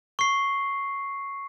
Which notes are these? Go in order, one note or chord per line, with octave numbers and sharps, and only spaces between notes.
C#6 C7